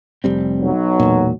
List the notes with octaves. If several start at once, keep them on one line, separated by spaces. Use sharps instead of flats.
F1 G3 C4
B1 F#3
E1 A#2